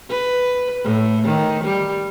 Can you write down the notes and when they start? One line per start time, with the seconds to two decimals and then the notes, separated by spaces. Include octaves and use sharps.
0.10 B4
0.85 A2
1.25 D#3
1.64 G3